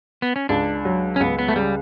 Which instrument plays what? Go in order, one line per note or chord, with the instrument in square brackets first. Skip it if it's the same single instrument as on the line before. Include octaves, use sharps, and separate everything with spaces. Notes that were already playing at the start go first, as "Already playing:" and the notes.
[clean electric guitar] B3
C#4
[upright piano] C#2 [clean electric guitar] D4
[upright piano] F#3
[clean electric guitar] C#4
[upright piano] C#2 [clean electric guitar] B3
[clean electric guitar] B3
A3
[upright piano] C#3 [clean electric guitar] G3